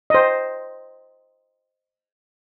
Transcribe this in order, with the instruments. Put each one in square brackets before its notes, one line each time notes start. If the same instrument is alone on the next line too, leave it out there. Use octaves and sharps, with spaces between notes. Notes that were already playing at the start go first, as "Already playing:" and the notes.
[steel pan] C5 D#5